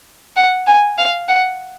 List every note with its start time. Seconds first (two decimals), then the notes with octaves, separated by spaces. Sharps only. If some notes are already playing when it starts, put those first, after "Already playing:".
0.36 F#5
0.67 G#5
0.98 F5
1.28 F#5